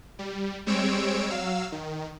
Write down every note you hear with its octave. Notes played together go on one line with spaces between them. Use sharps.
G3
G3 G#3 C4 C#5 E6 D7
F#3 F5 E6
D#3